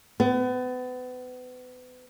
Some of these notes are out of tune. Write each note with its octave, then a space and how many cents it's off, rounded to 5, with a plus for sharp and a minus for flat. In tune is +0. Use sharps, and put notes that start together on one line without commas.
B3 +35